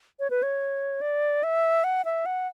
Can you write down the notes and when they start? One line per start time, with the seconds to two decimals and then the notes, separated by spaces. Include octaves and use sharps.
0.20 C#5
0.30 B4
0.43 C#5
1.01 D5
1.43 E5
1.84 F#5
2.05 E5
2.26 F#5